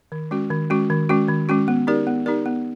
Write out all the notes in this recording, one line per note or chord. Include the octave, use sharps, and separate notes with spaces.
D#3
G#3 C#4 F#4
D#3
G#3 C#4 F#4
D#3
G#3 C#4 F#4
D#3
G#3 C#4 F#4
B3
D#4 G4 A#4 D5
B3
D#4 G4 A#4 D5
B3